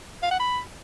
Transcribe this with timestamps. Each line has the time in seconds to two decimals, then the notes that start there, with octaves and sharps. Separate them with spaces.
0.22 F5
0.31 F#5
0.40 B5